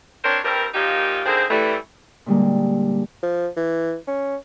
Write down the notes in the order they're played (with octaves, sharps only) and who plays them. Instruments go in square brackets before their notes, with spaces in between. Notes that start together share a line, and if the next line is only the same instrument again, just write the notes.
[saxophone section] C4 D4 A#4 C5 C#5
G2 G3 C4 G4 A#4
A#2 F3 A#3 D#4 G4
D3 D#3 A#3 C4 G#4 C5
E3 G3 A3
[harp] A#2 D3 G3 G#3 A#3
[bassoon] F3
E3
C#4